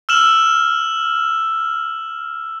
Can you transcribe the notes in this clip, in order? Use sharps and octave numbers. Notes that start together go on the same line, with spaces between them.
E6 F6 E7 F#7